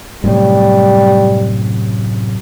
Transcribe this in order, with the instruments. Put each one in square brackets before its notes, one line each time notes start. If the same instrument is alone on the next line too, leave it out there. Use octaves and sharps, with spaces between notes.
[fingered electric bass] F#2 A2 C3 [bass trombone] G3